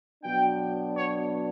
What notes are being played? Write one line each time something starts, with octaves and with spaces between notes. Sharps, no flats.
B2 F#3 B3 D4 G5
C#5